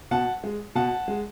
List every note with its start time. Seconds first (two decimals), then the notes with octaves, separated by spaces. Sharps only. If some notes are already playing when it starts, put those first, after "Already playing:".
0.11 B2 F#5 A5
0.44 G#3
0.75 B2 F#5 A5
1.08 G#3